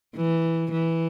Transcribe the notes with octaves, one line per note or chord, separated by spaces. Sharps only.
E3
E3